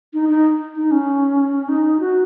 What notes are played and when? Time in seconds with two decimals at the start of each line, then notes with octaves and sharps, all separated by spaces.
0.14 D#4
0.29 D#4
0.76 D#4
0.91 C#4
1.69 D#4
2.00 F#4